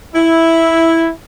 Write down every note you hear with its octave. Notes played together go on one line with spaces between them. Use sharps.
E4